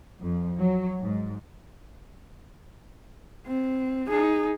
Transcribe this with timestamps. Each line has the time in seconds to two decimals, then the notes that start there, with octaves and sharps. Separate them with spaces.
0.19 F2
0.57 F#3
1.01 G#2
3.47 C4
4.08 D#4 G#4